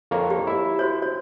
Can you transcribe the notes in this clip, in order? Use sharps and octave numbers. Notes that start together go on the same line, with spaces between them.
F2 A#3 C#5
G4
E4 E5
F#4 C5 C#5
C#5